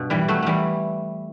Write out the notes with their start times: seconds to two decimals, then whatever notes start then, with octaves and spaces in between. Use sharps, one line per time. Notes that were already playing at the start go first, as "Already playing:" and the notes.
Already playing: G2 B2
0.10 E3 G3
0.28 F#3 A3
0.42 E3 G3 A3